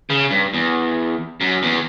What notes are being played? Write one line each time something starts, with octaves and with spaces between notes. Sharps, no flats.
C#3
G2
E2
F#2
E2